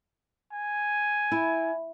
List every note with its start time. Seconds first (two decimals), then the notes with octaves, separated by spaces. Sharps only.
0.53 G#5
1.32 E4